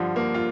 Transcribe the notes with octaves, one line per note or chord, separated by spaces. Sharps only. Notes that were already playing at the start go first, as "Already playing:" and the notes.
Already playing: G2 D3 F3
A#3
F4